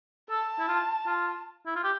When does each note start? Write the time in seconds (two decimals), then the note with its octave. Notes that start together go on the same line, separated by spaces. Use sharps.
0.29 A4 A5
0.59 E4
0.68 F4
1.07 F4
1.66 E4
1.75 F4
1.84 G4